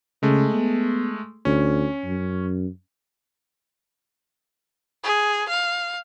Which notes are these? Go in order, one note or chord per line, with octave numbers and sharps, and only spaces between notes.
C#3 G#3 A3
B3
D2 C#4
F#2
G#4
F5